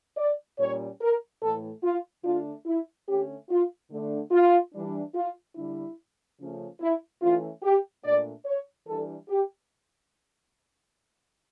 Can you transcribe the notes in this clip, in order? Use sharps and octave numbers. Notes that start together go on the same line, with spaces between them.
D5
A#2 G3 C#4 C#5
A#4
A2 E3 A3 A4
F4
D3 A3 D4 F4
E4
D3 A3 C#4 G4
F4
D3 A3 D4
F4
E3 G3 D4
F4
D3 G3 D4 E4
C#3 F3 A3 C#4
E4
E3 A3 C#4 F4
G4
A#2 A3 D4 D5
C#5
E3 G3 D4 A4
G4